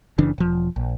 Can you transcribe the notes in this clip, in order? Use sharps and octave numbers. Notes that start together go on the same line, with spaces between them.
F#1 C#3 E3 D4
E1 F3
A#1